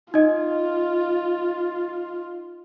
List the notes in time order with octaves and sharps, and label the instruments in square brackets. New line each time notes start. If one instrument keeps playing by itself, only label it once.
[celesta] D#4 D#5 [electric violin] F4